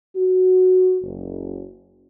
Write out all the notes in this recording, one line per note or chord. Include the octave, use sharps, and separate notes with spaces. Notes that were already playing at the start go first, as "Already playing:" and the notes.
F#4
F#1